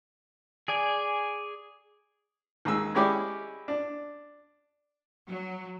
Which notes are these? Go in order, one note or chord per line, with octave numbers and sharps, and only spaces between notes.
G#4 D5 G#5
D#2 G#3 E6
G#3 C#4 E4 G4 C#5 D5
D4
F#3